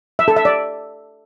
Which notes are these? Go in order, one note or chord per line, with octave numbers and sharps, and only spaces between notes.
E5
A4
E5
D5